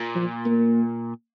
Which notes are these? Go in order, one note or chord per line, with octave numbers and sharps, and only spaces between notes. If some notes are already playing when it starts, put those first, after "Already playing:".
Already playing: A#2
F3
A#3